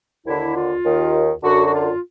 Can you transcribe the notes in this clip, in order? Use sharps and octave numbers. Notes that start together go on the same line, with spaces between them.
D#2 D3 E4
F4
D#2 D#3
F#2 D3 F#4
F#4
F4